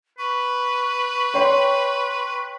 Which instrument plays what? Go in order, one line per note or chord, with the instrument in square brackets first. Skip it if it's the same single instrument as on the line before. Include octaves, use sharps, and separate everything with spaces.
[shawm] B4 [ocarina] C#6
[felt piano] C#5 G5 C6